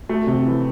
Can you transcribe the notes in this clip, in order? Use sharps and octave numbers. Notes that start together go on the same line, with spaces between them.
A3
C3
E3